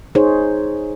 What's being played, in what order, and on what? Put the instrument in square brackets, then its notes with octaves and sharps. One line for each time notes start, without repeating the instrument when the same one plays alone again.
[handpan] D#4 G#4 C5 C#5